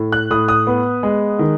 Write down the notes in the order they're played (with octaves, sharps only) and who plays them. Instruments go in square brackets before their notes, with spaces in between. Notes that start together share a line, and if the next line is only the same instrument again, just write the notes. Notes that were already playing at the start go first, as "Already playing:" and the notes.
Already playing: [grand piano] A2
F#6
A2 D#6
D#6
B3
G#3
D#3